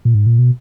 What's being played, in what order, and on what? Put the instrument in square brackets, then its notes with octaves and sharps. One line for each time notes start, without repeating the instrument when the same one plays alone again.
[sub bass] A#2
G#2
A#2
B2